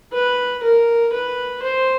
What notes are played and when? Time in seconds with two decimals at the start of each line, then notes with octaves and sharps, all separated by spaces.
0.13 B4
0.63 A#4
1.13 B4
1.63 C5